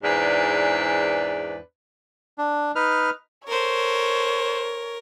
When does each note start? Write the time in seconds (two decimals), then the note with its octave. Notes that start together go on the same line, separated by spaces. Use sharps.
0.04 E2 G#2 D4 B4 C5 D5
2.38 D4
2.76 D#4 B4 F6
3.48 A4 A#4 C5 C#5